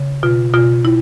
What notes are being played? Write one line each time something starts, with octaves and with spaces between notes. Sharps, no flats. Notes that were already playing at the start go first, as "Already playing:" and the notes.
Already playing: C#3
B2 F4
B2 F4
E4